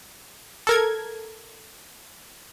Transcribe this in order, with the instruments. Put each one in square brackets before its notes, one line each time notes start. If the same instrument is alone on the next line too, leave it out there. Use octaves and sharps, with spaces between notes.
[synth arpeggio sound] A4 A#4 G#6